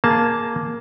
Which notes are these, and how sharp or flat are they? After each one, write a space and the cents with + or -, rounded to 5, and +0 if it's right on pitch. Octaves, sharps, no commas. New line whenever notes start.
A#3 +0 G#4 +15 A5 +0